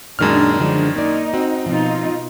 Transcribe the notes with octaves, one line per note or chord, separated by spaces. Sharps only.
F#2 A#2 D#3 G#3 D4 F6
D3 F3 G#3
A#3 D#4 D5
C4 F#4
B2 F3 D#4 F4